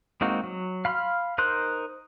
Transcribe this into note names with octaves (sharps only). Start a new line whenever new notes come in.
G#3 A#3 C4 D#4 F#4
F#3
F5 B5 C6 F6
D#4 A#4 C5 C6 F#6